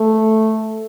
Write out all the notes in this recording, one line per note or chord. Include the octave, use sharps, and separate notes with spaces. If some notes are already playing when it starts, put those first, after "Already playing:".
Already playing: A3